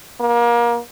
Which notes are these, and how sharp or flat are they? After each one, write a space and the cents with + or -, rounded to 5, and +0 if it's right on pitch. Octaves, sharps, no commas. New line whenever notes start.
A#3 +30